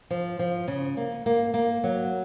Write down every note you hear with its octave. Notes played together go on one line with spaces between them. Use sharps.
F3
F3
C#3
A#3
A#3
A#3
F#3